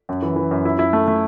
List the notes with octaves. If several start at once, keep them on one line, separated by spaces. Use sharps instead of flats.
F#2
E3
E3
F#2
E4
E4
A3
A3